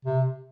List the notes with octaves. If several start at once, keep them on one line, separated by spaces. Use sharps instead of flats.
C3